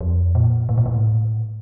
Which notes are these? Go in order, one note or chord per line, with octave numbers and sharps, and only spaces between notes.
F2
A#2
A2
A#2
A2